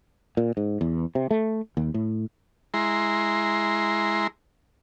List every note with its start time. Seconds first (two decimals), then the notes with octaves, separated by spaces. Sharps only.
0.37 A#2
0.57 G#2
0.81 E2
1.15 C3
1.31 A3
1.77 D#2
1.94 A2
2.74 G#3 E4 A#5 C6